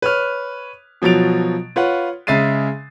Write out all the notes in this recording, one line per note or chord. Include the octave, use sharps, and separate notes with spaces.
B4 C#5 F6
B2 F3 F#3 A6 D7 F7
F4 B4 C#5 F#5
C#3 G#3 E5 A6 C7 D#7